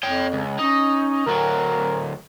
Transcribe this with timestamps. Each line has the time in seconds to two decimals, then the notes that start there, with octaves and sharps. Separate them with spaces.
0.03 F2 C#5 G5
0.33 C#2
0.59 C#4 D#4
1.26 D2 F#3 A#4